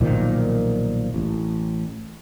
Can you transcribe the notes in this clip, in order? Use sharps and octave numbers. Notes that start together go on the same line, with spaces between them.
B1 A#2 D#3 F3
A1